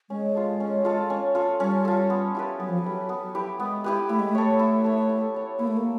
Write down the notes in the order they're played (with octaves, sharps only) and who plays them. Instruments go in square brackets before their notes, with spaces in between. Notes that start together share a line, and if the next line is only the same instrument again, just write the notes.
[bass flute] G#3 [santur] C#4
[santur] F4 A4
C#4
F4 A4
C#4
F4 A4
[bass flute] G3 [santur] C#4
[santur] F4 A4
B3
E4 G4 B4
[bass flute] F#3 [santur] B3
[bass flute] F3
F#3
[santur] E4 G4 B4
B3
E4 G4 B4
[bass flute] G#3 [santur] B3
[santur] E4 G4 B4
[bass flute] A3 [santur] E4
[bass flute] G#3
A3
[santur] A4 C#5
E4
A4 C#5
E4
A4 C#5
[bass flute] A#3 [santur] E4
[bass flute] A3
A#3